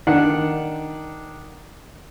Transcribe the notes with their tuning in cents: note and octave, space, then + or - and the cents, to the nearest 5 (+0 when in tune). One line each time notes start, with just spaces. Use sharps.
D#3 +0 D4 +0 F#5 -10